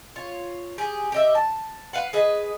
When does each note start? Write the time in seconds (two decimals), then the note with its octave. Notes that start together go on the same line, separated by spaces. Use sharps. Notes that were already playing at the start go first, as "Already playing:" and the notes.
0.16 F4 C#5
0.78 G4 G#4
1.12 G4 D#5 E5
1.35 A5
1.93 B4 F5 F#5
2.13 G#4 B4 D#5